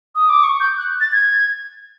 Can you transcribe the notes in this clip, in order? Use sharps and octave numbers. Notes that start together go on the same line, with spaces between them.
D#6
D6
C#6
G6
F#6
A6
G#6